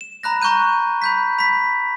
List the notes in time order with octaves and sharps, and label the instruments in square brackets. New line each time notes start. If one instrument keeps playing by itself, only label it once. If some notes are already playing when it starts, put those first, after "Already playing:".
[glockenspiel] E7
A#5 B5 F#6 A#6
A#5 C#6 F#6 G6 D#7
B5 G6 B6
B5 B6